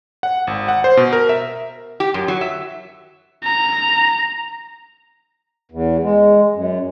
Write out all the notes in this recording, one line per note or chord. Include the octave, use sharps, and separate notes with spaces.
F#5
G#1
F#5
C5
B2
A#4
E5
G4
F#2
F#3
E5
A#5
E2
G#3
F#2